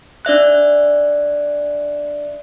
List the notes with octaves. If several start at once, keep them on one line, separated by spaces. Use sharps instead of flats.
D4 D5 E5 F#6